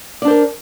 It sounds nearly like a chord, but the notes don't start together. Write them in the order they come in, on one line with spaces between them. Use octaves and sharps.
D5 D4 C5 A#4